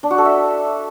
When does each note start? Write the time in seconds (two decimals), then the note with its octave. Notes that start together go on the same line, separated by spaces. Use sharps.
0.03 D4
0.11 F#4
0.18 A4
0.25 E5